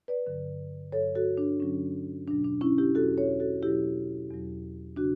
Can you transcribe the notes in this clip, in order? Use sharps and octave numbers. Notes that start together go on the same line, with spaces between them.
B4 D5
G2 D3 F#3
G2 D3 F#3 A4 C#5
F#4 A4
D4
G2 D3 F#3 C#4
E2 B2 F#3 D4
D4
C#4 E4
E4 G4
E2 B2 F#3 F#4 A4
A4 C#5
F#4 A4
E2 B2 F#3 E4 G4
E2 B2 F#3
C#3 D4 F#4